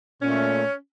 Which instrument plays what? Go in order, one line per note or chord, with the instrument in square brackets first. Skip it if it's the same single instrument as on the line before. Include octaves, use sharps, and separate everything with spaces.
[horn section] A#2 A3 C#4